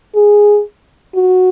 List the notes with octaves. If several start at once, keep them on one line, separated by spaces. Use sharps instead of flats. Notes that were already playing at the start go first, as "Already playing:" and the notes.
G#4
F#4